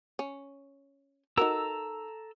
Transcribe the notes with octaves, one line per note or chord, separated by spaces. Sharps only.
C#4
D#4 F#4 A4 A#4 A#5 E6